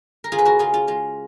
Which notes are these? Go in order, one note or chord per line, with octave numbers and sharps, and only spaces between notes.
A#4
C#3 F4 G#4
B4
F#4 A#4
C#3 F4 G#4
F4
G#3 F4